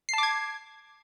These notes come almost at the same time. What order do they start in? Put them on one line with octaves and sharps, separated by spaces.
C7 A5 D6 G#6